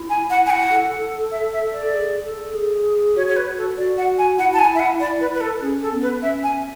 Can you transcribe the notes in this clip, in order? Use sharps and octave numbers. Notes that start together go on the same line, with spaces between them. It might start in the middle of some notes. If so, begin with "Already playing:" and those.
Already playing: E4
G#5
F#5
G#5
F#5
A4
E5
E5
D5
G#4
A4
G#4
F#4 C#5
C#5
B4
A4
F#4 D5
F#5
G#5
E4 F#5
A5
G#5
E5
F#5
D5
B4
B4
A4
C#4 G#4
A4
B3
B4
C#4 E5
G#5